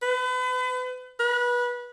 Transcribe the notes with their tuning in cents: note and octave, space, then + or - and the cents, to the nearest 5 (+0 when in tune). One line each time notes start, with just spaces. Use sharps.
B4 +35
B4 -25